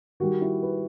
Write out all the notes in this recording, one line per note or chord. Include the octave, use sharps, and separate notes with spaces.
D#3 G3 F#4
E4
B4